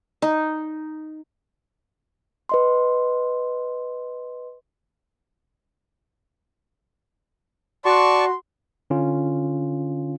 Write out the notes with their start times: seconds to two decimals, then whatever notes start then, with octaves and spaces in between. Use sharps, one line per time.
0.22 D#4
2.49 B4 D#5 C6
7.85 F#4 D5 A5 C6 C#6
8.90 D3 C#4 F4